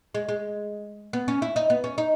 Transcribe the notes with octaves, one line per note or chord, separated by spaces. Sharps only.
G#3
G#3
B3
C#4
E4
D#4
B3
C#4
D#4